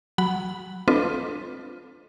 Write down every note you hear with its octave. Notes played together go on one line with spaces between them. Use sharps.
F#3 F#5 B5
C4 D4 F4 A4 B4 D#5